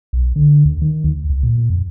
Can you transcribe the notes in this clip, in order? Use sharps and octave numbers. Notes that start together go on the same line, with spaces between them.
B1
D3
D2
D#3
D2
C#2
A#2
A#2
F2